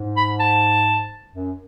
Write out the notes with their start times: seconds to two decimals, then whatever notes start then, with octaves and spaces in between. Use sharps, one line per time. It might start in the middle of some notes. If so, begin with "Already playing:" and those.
Already playing: G#2
0.17 B5
0.40 A5
1.33 F#2